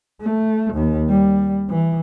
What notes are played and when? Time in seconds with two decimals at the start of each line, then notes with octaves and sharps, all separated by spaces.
0.21 A3
0.74 D#2
1.09 G3
1.69 E3